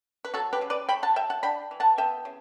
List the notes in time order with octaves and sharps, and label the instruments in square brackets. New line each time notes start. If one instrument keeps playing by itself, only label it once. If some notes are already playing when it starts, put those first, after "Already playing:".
[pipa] B4
F#3 F#4 A4
G4 B4
C#3
B4 D5
A3 G5 B5
F#5 A5
F#3 E5 G5
F#5 A5
D4 G5 B5
E3
F#5 A5
B3 E5 G5
C#3